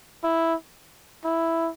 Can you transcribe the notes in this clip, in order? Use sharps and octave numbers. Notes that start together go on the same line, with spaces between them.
E4
E4